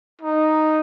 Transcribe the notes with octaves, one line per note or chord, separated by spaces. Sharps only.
D#4